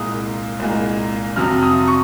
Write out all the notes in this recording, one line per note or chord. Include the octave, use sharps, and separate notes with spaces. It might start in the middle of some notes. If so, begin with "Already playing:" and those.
Already playing: C2 A#2 G#3 D#6
C2 A#2 G#3
F2 C3 F#3 F6
D#6
C#6